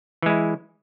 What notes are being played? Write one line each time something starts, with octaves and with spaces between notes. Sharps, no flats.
E3 G#3 E4